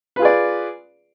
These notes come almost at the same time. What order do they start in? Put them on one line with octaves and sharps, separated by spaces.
B4 F4 G#4 D5